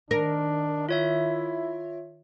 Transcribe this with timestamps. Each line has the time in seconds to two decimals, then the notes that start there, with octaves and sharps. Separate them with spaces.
0.11 D#3 D4 A#4
0.89 E4 F4 C#5 E5